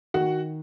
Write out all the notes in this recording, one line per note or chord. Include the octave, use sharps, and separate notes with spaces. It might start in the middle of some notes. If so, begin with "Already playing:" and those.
D#3 F#4 F#5